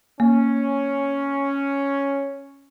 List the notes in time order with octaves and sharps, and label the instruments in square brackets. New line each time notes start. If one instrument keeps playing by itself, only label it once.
[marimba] A#3 [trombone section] C#4